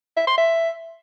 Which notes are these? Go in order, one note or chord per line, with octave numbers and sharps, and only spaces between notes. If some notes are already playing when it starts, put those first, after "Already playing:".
E5
C6
E5